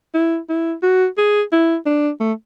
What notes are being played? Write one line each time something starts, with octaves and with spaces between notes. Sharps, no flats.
E4
E4
F#4
G#4
E4
D4
A3